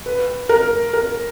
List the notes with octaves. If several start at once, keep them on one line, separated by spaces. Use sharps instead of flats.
B4
A#4
A#4